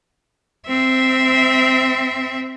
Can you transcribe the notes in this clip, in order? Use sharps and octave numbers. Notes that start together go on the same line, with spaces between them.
C4 E5